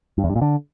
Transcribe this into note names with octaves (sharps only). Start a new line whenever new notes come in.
G2
E2
G2
A#2
D3